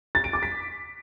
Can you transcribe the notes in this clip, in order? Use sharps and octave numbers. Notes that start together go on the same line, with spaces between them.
A6
D7
D6
B6